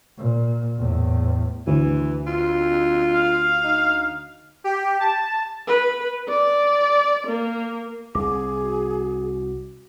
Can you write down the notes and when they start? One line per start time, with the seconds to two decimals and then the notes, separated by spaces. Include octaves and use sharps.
0.18 A#2
0.79 E2 A2
1.67 D2 E3
2.27 F4
3.14 F5
3.64 D#4
4.64 G4
5.00 A5
5.67 B4
6.28 D5
7.27 A#3
8.15 C2 G#4 D6
8.61 F#4